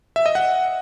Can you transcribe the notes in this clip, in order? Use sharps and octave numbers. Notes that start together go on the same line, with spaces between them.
E5
D#5
F#5